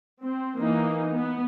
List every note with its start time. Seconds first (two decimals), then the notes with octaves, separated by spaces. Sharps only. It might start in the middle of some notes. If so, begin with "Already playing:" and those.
0.23 C4
0.56 E3 A#3 D#4
1.13 B3